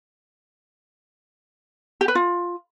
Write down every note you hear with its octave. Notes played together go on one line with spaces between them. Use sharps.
G4
B4
F4